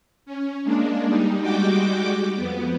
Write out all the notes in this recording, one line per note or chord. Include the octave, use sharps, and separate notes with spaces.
C#4
G#3 A#3 D4
G3 D#4
G3 G#3 F#4 G5 D6
F2 B3